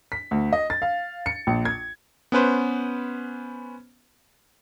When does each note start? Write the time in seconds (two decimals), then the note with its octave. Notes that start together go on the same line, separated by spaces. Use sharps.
0.12 B6
0.31 D2
0.53 D#5
0.70 A6
0.82 F5
1.26 C#7
1.47 A#1
1.65 G#6
2.32 B3 C#4 B4 C5